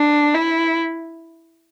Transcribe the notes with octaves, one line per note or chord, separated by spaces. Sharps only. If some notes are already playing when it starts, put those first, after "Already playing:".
Already playing: D4
E4